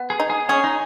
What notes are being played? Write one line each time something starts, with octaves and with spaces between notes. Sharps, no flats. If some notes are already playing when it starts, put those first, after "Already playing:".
Already playing: B3
G#4
D#4
G#4
C#4 G#4
D#4